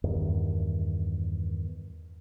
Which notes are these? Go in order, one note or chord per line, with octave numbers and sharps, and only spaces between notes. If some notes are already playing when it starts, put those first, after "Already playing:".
E2 G2 D#3